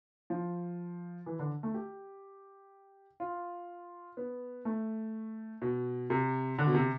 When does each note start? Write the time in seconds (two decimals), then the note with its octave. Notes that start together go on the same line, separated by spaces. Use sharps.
0.30 F3
1.26 E3
1.39 D3
1.63 A3
1.74 G4
3.20 F4
4.17 B3
4.65 A3
5.62 B2
6.10 C3
6.58 D3
6.67 B2
6.75 C3